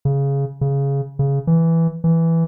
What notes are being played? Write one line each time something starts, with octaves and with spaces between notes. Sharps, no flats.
C#3
C#3
C#3
E3
E3